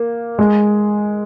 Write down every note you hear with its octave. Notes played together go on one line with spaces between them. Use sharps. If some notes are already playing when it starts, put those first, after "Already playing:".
Already playing: A#3
G#3